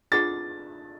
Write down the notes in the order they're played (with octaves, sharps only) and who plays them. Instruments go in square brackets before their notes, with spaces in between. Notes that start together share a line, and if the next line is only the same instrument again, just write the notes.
[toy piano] D4 F4 G#4 B4 F#5 [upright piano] A6